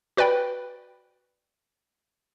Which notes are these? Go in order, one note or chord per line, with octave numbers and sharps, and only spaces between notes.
F#4 B4 D5 G5 B5